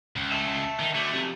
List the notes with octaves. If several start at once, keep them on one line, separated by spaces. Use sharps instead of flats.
C#2
E5 A5
D#3 D#4
D2 A3 D4
C3 F3